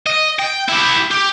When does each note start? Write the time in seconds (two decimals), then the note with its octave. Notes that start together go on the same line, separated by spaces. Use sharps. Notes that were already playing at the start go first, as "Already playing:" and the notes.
0.06 D#5
0.39 G5
0.68 E4 G4
1.11 G4